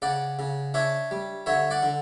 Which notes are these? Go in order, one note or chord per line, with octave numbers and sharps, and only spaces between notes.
C#3 D5 F#5
C#3
D4 C#5 E5
G3
D3 C#5 E5
D5 F#5
D3